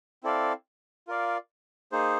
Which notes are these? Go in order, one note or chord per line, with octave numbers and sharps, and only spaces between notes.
C4 E4 A4 D5 F5
F4 A#4 D5 F5
A#3 D#4 G#4 C5